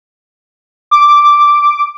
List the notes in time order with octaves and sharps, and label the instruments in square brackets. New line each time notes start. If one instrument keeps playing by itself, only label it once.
[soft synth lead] D6